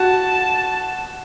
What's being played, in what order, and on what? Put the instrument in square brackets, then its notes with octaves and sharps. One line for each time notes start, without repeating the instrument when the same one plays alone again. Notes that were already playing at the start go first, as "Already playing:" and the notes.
Already playing: [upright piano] F#4 [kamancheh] A5